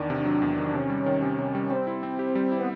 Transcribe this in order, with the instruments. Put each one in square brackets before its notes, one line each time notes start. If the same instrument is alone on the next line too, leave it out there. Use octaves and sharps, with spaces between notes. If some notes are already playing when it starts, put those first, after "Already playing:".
Already playing: [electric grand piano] E2 D#3 [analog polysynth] D4
[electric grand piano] C3
F#3
E2
D#3
[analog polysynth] D4
[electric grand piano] C3 [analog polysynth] C#4
[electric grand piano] G3
D#3
C3
C3
G3
[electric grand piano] G3 [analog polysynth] C4
[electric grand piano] E4
C4
G4
G3
E4
[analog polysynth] B3